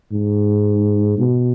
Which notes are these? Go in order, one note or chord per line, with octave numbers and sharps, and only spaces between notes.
G#2
B2